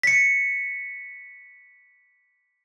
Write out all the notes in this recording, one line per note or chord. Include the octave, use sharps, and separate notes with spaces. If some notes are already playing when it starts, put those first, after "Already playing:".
B6 C#7